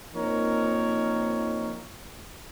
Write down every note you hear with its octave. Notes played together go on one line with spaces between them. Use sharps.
F3 A#3 C4 D#4 A#4 C#5